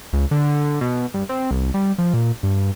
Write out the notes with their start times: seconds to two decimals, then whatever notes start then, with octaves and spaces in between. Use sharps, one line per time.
0.13 C#2
0.31 D3
0.81 B2
1.14 G2
1.29 C4
1.51 C2
1.74 G3
1.98 F3
2.14 A#2
2.43 G2